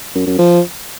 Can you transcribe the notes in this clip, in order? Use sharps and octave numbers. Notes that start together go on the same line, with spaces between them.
F#2
F#2
F3